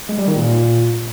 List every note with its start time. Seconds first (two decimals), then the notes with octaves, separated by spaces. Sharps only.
0.09 G#3
0.18 G3
0.28 D#3
0.37 A#2